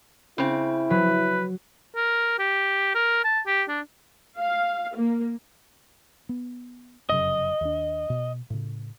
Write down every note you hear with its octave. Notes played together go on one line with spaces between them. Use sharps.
C#3 C4 E4
F#3 B4
A#4
G4
A#4
A5
G4
D4
F5
A#3
B3
F1 F#2 C#3 D#5
D#2 D4
B2
A2 C#3